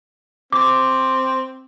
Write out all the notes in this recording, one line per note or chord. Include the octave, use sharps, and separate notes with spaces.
C4 D6